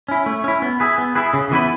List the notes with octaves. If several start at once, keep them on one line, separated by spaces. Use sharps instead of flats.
C#4 E4
A3
C#4 E4
B3
E4 G#4 B4
B3
E4 G#4 B4
C#3
E3 B3 E4 B4